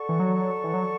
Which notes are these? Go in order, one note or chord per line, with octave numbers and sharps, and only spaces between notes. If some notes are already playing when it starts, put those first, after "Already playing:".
Already playing: A4 D5 F#5 C#6
E3
F#3
E3
F#3